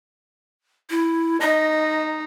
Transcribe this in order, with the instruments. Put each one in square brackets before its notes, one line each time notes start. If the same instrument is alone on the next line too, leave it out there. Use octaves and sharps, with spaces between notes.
[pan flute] E4
[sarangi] D#4 [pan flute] D#5